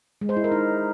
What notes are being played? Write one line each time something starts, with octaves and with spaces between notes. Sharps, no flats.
G#3
C5
E4
A#4
D#4